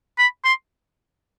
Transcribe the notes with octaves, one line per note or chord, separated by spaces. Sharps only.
B5
C6